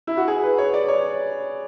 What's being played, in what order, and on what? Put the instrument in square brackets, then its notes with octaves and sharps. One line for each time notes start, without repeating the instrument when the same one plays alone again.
[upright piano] E4
F#4
G#4
B4
C#5
D5
C#5